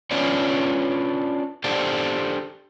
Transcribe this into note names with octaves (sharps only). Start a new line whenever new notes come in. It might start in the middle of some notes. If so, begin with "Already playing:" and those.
C#4 D4 F4 B4 C#5 D5
D4 G4 A4 C5 D5